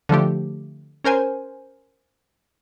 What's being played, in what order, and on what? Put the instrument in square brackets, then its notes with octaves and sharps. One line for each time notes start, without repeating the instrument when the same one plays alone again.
[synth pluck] D3 F3 A3 G4
C#4 A#4 C5 G#5